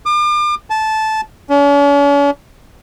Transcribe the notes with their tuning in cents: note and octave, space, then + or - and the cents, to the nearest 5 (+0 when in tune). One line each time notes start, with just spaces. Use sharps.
D6 +40
A5 -15
C#4 +45